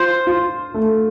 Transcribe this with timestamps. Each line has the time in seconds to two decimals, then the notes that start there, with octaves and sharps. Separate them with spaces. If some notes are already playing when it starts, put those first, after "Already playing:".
Already playing: F4 C5
0.27 F4
0.74 A3